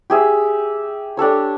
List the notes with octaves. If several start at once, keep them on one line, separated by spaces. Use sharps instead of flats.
G4 G#4 E5
D4 G4 A4 C#5